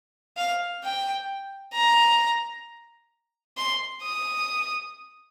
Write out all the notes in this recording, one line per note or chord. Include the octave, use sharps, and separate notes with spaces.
F5
G5
A#5
C6
D#6